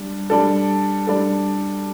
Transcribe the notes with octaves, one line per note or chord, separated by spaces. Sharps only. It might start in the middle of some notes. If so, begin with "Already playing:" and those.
Already playing: G3 D4
G3 D4 A4
G3 D4 A4